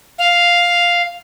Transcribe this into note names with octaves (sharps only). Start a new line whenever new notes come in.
F5